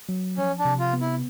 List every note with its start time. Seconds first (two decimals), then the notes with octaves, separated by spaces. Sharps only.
0.09 F#3
0.37 F3 C#4
0.59 D4
0.65 C3
0.79 F4
0.93 B3
1.01 E4